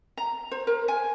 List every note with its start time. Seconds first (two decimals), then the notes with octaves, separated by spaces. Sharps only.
0.17 A#5
0.52 C5
0.67 A#4
0.88 G#5